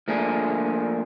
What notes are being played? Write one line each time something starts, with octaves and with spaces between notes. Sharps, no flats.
F3 A3 A#3 D4 G#4